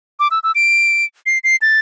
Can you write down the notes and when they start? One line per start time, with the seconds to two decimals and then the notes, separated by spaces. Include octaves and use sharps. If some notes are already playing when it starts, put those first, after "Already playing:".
0.20 D6
0.31 E6
0.43 E6
0.55 D7
1.26 C7
1.44 C7
1.62 A6